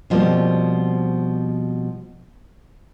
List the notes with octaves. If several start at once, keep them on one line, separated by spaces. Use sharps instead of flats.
B2 F3 G3 A#3 C4